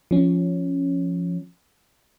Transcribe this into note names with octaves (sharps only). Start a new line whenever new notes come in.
F3 C#4